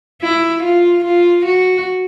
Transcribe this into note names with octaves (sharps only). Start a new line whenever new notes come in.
E4
F4
F4
F#4